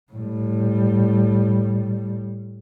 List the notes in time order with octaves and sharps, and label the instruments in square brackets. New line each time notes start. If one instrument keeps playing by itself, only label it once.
[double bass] A2 G3